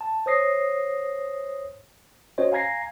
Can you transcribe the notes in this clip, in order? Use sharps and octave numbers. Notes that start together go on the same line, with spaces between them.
A5
C5 C#5 D#6 A#6 C7
C#4 F#4 C5 C#5 D#5
F5 G#5 A#5 G#6 A#6 C7